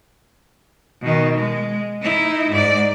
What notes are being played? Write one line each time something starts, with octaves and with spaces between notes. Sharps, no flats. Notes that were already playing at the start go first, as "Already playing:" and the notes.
B2 D#3
G#3
D#4 E4
G#2 D5